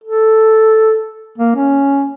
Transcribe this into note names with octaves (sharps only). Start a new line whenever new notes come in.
A4
A#3
C#4